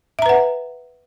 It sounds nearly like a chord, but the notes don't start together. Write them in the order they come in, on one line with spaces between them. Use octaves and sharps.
E5 A#5 B4 F#5